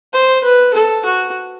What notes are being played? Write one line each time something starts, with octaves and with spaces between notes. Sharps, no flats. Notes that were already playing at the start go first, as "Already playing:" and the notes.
C5
B4
A4
F#4